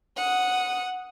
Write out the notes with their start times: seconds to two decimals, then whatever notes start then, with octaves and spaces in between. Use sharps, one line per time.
0.17 F#5 D#6